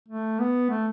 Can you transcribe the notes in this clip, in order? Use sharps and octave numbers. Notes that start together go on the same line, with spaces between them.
A3
B3
A3